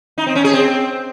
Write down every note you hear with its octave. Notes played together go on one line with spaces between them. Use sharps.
D#4
C4
C#4
G#4
C4